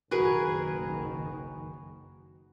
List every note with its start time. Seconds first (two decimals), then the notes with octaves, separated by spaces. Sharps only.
0.11 F#1 B1 D#3 F#4 G#4 A#4 B4